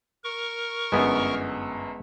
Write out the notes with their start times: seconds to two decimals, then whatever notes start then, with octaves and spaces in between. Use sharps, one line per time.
0.24 A#4 C#6
0.92 G1 F#2 G#3 B3 E4